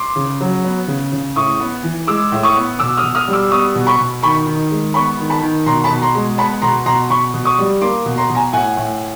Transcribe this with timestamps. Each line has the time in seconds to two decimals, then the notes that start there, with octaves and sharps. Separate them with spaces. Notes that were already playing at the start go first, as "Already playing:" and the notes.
Already playing: C6 D6
0.16 C#3
0.41 F#3
0.64 B3
0.88 C#3
1.13 C#3
1.36 A2 C#6 D#6
1.60 B3
1.83 E3
2.07 G#3 D6 E6
2.32 A2
2.43 C#6 D#6
2.55 B3
2.79 B2 D6 E6
2.97 D#6 F6
3.03 B2
3.15 D#6 F6
3.28 G3
3.33 D6 E6
3.51 B3 C#6 D#6
3.75 B2
3.87 B5 C#6
3.98 B2
4.23 D#3 B5 C#6
4.47 D#3
4.71 G#3
4.94 B3 B5 C#6
5.18 D#3
5.30 A5 B5
5.42 D#3
5.66 B2 A#5 C6
5.84 A5 B5
5.90 B2
6.02 A#5 C6
6.15 G#3
6.38 B3 A5 B5
6.62 B2 A#5 C6
6.86 B2 A#5 C6
7.10 B2 B5 C#6
7.34 B2
7.45 C#6 D#6
7.58 G3
7.81 A#3 C6 D6
8.06 B2
8.18 A#5 C6
8.30 B2
8.35 G#5 A#5
8.53 A2 F#5 G#5
8.77 A2